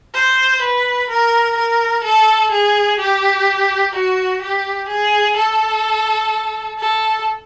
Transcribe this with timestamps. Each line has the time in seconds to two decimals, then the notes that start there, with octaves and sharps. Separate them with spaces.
0.14 C5
0.61 B4
1.09 A#4
1.57 A#4
2.04 A4
2.51 G#4
2.99 G4
3.93 F#4
4.42 G4
4.88 G#4
5.36 A4
6.78 A4